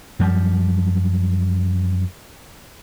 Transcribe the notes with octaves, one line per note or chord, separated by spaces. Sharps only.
F#2 F3 G3